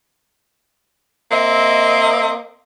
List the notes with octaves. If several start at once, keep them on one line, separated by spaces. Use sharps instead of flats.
A#3 C4 D#5 E5